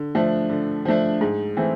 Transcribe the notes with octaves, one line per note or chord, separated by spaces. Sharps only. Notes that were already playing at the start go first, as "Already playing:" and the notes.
Already playing: D3
F3 A3 D4
D3
F3 A3 D4
G#2
E3 A3 C4